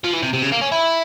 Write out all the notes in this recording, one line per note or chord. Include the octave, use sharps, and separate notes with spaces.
F3
E3
C3
C3
C#3
A#3
C#4
E4